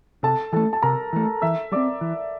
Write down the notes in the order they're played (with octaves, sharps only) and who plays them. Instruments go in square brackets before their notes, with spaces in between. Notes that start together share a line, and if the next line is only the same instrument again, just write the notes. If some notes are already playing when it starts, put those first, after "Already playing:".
[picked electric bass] C3 [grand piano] A4 A5
[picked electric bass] E3 A3 [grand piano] A4 A5
[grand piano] A5
[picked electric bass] C3 [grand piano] A#4 A#5
[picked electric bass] E3 A3
[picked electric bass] E3 [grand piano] E5 E6
[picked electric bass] G3 C4 [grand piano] D5 D6
[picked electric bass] E3